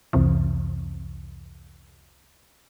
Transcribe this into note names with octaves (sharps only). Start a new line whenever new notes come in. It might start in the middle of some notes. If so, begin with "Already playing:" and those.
C2 F2 C3 E3